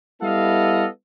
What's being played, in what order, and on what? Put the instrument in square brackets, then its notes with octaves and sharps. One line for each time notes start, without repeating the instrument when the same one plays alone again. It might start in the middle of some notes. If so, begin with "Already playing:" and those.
[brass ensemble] G3 B3 E4 A4 D#5 F5